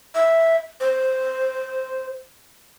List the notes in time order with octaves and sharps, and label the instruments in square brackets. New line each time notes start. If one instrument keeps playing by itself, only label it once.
[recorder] E5
C5